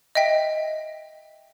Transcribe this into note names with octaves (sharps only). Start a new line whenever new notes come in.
D#5 E5 G5 B6